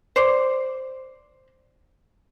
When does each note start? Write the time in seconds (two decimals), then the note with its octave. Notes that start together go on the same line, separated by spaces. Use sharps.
0.16 C5 D5